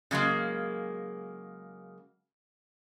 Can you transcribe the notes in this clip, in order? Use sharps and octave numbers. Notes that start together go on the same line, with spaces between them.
C#3 F#3 G#3 A#3